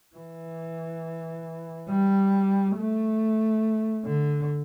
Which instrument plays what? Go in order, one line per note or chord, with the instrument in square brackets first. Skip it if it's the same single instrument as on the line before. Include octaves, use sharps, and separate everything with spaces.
[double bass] E3
G3
A3
D3